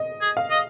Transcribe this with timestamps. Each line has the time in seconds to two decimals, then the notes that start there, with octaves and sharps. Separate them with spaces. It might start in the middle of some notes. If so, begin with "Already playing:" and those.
Already playing: D#5
0.21 G#4
0.37 F5
0.50 D#5